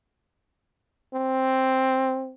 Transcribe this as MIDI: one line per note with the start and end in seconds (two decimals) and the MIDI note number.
1.14 2.34 60